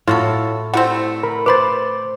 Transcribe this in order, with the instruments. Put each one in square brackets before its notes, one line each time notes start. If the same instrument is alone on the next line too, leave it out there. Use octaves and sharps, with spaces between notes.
[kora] A2 [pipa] F4 F#4 A4
[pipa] G3 A3 C4 [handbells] E4 F#5
[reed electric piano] A#4 B5
[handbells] B4 B5 A6 [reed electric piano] C5 D6